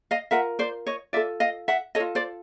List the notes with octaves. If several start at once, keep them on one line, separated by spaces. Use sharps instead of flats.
D#5 F5
F4 A#4 E5 F#5
C5 D5
C#5 D#5
F4 A4 D5 E5
D#5 F5
E5 F#5
A4 C#5 D#5
F4
C5 D5